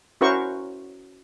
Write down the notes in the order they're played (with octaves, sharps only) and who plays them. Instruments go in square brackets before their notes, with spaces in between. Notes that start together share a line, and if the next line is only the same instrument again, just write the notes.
[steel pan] C#4 E4 F#4 A#4 C5 C#6